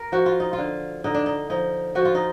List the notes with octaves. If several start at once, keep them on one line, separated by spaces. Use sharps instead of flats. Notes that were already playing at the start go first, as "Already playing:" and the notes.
Already playing: A#4
F3 F#4
F4
D#4
F4
D3
D3 D#4
D4
D#4
F3 D#4
F3 F#4
F4
D#4